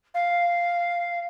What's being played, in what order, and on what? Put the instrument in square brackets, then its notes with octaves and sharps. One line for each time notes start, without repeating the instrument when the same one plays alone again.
[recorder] F5